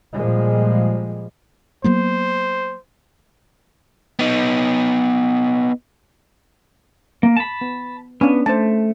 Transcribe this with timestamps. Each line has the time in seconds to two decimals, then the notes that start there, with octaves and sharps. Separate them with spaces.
0.14 A#2 F3 G3 G#3
1.84 F#3 A#3 B3 C5
4.19 B3 D#4
7.23 A#3
7.37 A5 B5
7.61 B3
8.21 B3 C#4 D4
8.46 A3 C5 A5